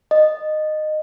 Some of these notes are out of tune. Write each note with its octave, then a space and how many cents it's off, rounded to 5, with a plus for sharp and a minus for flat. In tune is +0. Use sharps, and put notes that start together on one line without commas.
D#5 -15